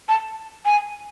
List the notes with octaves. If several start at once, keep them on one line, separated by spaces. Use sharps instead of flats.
A5
G#5